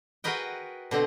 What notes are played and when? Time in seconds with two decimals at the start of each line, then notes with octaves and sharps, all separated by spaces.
0.24 F#4 G#4 A#4 B4 D#5 G5
0.91 B2 D3 C4 D#5 F#5